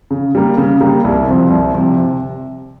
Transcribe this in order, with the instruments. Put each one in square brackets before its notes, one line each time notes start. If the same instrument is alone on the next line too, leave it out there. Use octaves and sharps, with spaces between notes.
[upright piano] C#3
G3 A#3
C#3
G3 A#3
C2
C3 F3
C2
C3 F3
C3